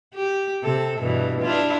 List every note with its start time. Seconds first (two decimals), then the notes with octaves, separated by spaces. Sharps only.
0.14 G4
0.63 C3 A4
0.99 G2 B2 E3
1.41 D4 E4 F4